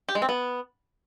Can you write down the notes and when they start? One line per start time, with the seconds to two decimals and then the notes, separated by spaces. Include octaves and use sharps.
0.09 G4
0.15 G#3
0.22 C4
0.29 B3